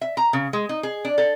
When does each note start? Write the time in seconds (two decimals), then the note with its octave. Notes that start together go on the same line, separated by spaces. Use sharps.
0.01 E5
0.17 A#5
0.33 C#3
0.53 G#3
0.69 D#4
0.83 G#4
1.05 D4
1.18 A4